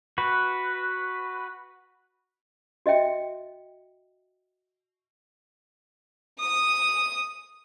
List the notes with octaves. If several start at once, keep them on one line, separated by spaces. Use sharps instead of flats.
F#4 B4
F#4 D#5 E5 G5
D#6